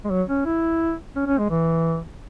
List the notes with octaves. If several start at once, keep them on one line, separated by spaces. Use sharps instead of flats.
G#3
F#3
C#4
E4
C#4
C#4
G#3
E3